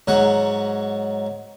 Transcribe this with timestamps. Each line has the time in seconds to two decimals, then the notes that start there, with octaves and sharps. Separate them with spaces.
0.07 G#2 F#3 F#5